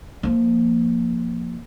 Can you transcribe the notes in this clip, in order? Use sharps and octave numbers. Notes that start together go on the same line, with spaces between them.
F3 A#3